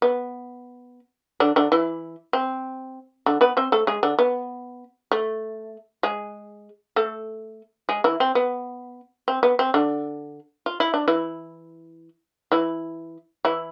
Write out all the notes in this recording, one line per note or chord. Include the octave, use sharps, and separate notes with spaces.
B3
D3 D4
D3 D4
E3 E4
C4
D3 D4
B3 B4
C4 C5
A3 A4
G#3 G#4
D3 D4
B3
A3
G#3 G#4
A3 A4
G#3 G#4
E3 E4
C4
B3
C4
B3
C4
D3 D4
F4
E4
D4
E3 E4
E3 E4
E3 E4